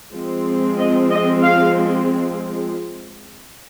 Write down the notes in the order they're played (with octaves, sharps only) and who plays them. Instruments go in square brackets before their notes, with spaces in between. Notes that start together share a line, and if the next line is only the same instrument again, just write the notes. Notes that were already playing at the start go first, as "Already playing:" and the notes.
[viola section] F3 G#3 C4
D#5
D#5
F5